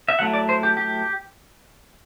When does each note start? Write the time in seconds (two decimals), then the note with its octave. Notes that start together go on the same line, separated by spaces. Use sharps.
0.08 E5
0.19 F#3 A3 E4 F#5
0.33 D5
0.49 C5
0.63 G4
0.77 G4